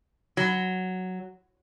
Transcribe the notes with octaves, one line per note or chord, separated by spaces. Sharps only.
F#3